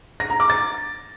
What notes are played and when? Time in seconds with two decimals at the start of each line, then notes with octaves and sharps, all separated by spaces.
0.20 A#6
0.30 A#5
0.40 D6
0.50 A6